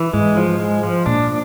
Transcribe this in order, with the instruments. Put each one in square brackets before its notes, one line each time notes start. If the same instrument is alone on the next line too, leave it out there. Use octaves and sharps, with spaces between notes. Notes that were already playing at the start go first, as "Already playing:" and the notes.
Already playing: [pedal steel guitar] E3
[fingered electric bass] G#2 [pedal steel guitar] G#3
[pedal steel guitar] F3
G#3
F3
[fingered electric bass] A#2 [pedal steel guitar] D4